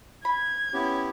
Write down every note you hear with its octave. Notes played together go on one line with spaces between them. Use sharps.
B5 G#6
B3 C#4 E4 G4